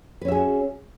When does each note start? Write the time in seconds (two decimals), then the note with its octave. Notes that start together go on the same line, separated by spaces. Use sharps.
0.22 B4
0.25 C#4
0.28 E5
0.32 G#4
0.35 F#4